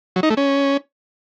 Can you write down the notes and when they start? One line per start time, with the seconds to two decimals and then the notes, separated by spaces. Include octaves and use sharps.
0.16 F#3
0.23 D#4
0.30 A3
0.37 C#4